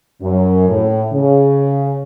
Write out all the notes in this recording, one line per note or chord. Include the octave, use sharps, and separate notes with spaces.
F#2
A2
C#3